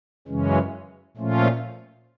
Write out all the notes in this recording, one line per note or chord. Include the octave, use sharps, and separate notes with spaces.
F#2 C#3 E3 G#3 C#4
A#2 F3 A3 C#4 F4